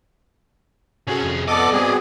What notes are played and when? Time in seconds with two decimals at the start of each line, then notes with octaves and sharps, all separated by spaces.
1.07 C3 C#4 F#4 G#4 A4
1.23 F2
1.48 B3 A4 D5 D#5 D6
1.73 G3 B3 C4 F#4 G#4